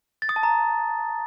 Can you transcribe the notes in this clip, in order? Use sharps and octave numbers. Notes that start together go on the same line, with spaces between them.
A6
D#6
A5
A#5